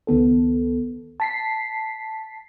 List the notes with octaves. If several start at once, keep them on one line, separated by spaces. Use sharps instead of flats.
C#2 D#3 B3 A4
A5 B6 C7